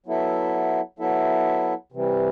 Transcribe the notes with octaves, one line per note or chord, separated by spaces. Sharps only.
F#3 B3 E4 A4 E5
F#3 B3 E4 A4 E5
C3 E3 G3